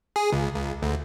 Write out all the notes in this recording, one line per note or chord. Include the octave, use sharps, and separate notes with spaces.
G#4
C#2
C#2
D2